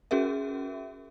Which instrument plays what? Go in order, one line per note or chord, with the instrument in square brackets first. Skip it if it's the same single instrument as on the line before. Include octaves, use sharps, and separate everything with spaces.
[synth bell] C#4 F#4 G#4 A#4 E5